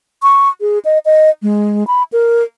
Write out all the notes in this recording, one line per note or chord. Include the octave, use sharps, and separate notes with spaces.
C#6
G#4
D#5
D#5
G#3
B5
A#4